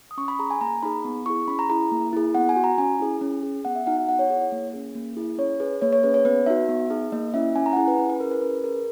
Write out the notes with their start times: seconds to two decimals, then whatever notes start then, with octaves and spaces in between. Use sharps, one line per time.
0.11 D#6
0.17 C#4 C#6
0.28 B5
0.39 G#4 A#5
0.50 G#5
0.61 A#3 A#5
0.83 D#4 G#4 B5
1.05 B3
1.26 E4 G#4 C#6
1.48 C#4 B5
1.59 A#5
1.69 E4 G#4 A#5
1.91 A#3
2.13 E4 G#4
2.35 B3 F#5
2.49 G#5
2.56 F#4
2.64 A#5
2.78 C#4 G#5
2.99 E4 G#4
3.21 C#4
3.43 G#4
3.65 B3 F#5
3.76 E5
3.87 D#4 F#4 F#5
3.97 F#5
4.08 B3 F#5
4.19 C#5
4.30 E4 G#4 C#5
4.52 A#3
4.73 C#4 G#4
4.95 A#3
5.17 E4 G#4
5.38 C#4 C#5
5.60 G#4 B4
5.82 A#3 C#5
5.93 C#5
6.03 C#4 G#4 B4
6.14 C#5
6.25 B3 B4
6.46 D#4 F#4 E5
6.69 B3
6.90 D#4 G#4
7.12 A#3 D#5
7.34 C#4 E4 E5
7.56 C#4 G#5
7.66 A#5
7.73 F#5
7.77 E4 G#4 G#5
7.88 B4
7.99 C#4
8.09 B4
8.20 E4 G#4 A#4
8.31 B4
8.42 C#4 B4
8.64 G#4 A#4